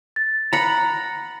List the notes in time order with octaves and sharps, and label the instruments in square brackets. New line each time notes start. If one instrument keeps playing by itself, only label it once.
[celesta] A6
[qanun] F#5 B5 [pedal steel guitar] A#5